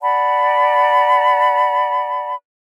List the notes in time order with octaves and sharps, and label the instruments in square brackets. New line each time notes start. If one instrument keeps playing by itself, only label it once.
[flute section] D5 F#5 A5 B5